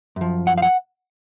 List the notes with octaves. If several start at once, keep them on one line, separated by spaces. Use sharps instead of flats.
F#2 F3
F#5
F5
F#5